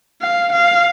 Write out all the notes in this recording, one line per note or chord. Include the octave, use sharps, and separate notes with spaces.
F5
F5